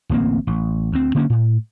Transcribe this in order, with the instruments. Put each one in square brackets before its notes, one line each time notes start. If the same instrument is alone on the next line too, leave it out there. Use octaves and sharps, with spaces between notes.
[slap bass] D1 A1 A#3 C4
A1
D2 C4
D3 A#3 C#4
A2